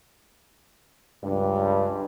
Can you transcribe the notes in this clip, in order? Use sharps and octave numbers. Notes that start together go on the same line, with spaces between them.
C#2 G2